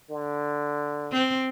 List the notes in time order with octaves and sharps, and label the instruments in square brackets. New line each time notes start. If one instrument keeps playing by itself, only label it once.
[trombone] D3
[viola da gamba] C4